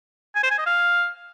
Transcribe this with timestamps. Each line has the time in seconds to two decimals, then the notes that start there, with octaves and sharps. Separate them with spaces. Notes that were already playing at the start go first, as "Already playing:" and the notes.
0.36 G#5
0.43 C5
0.51 G#5
0.59 D#5
0.66 F5